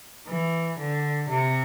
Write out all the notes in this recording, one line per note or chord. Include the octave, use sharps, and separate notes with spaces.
E3
D3
C3